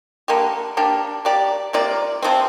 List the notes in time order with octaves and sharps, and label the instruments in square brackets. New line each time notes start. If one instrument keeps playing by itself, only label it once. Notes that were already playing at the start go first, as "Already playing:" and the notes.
[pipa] D3 A#3 G4
A#3 D4 G4
A#3 G4 D5
C3 A#3 F4 D5
C3 F3 C4